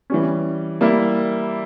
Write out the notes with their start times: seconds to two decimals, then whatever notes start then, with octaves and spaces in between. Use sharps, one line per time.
0.10 E3 G3 C#4
0.81 G3 A#3 E4